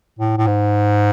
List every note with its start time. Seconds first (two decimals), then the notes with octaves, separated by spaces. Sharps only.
0.19 A2
0.38 A2
0.47 G#2